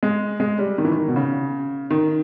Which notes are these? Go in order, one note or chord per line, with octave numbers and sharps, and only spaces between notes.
G#3
G#3
G3
D#3
E3
D#3
B2
C#3
D#3